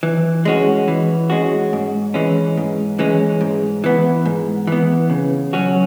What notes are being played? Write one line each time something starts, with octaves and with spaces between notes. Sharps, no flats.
E3
G#3 C#4 F#4
E3
G#3 C#4 F#4
G#2
E3 G#3 C#4
G#2
E3 G#3 C#4
G#2
E3 B3
G#2
E3 B3
C#3
F#3 C#4 F#4